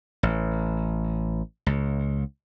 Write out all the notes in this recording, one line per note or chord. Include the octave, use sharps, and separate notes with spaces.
A1
C#2